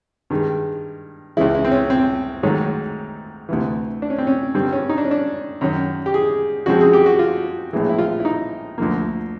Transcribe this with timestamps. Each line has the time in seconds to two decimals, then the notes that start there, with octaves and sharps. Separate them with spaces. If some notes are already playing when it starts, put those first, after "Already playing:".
0.30 G2 D#3 G#3
1.37 C#2 C#3 E3 G#3 E4
1.54 E4
1.65 C4
1.71 C#4
1.90 C4
2.43 G#2 D#3 F#3 A3
3.49 D2 C3 E3
4.02 D4
4.10 C#4
4.18 C4
4.27 C#4
4.54 G2 D3 G3 C4
4.73 C#4
4.90 D#4
4.98 D4
5.05 C#4
5.11 D4
5.61 F#2 D#3 F#3
6.06 G4
6.14 G#4
6.66 F#2 C#3 F3 G#3 C4 F#4
6.81 G#4
6.93 G4
7.06 F#4
7.19 F4
7.73 A#1 A2 E3 G#3
7.89 E4
7.99 F4
8.20 E4
8.25 D#4
8.78 D2 D3 F3 A#3